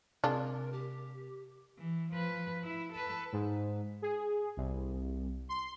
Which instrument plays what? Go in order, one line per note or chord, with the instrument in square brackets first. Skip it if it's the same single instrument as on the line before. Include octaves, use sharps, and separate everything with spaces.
[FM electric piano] C3 [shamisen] G#3 D4 F4 [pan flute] A#4
[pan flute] G4
[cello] E3
F3 B4
E4
A4 B4
[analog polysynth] G#2
G#4
C2
C6